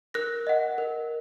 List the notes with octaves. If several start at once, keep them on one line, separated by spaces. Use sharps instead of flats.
A#4 F#6 A#6
D#5 F#5
A#4